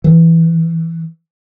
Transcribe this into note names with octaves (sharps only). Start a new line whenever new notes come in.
E3